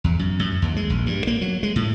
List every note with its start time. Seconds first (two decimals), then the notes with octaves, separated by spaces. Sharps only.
0.04 E2
0.19 F#2
0.39 F#2
0.62 D#2
0.76 G#3
0.90 A#1
1.06 G2
1.27 A#3
1.41 F#3
1.63 G#3
1.76 A2